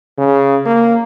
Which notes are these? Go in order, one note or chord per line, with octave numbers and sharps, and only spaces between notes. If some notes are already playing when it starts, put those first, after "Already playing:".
C#3
A#3